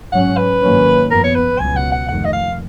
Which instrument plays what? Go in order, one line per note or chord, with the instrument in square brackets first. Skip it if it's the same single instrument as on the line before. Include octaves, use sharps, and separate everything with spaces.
[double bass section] G#2 F#3 C#4 [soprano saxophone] F#5
[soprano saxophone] B4
[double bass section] G#2 D#3 F#3 A#3 C#4
[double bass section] F#2 F3 B3 [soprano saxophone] A#4
[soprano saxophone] C#5
B4
[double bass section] C#2 B2 F#3 B3 [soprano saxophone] G#5
[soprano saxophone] F#5
F#5
[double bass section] F1 F2 D#3 [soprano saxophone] F#5
[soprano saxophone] D#5
F5